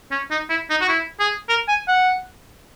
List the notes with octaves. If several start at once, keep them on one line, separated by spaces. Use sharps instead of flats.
C#4
D#4
E4
D#4
F#4
E4
G#4
A#4
G#5
F#5